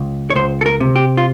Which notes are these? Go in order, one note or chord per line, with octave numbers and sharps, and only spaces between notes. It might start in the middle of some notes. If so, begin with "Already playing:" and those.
Already playing: C#2
C#5
C#2 C5
A4
A#4
C3
G4
F4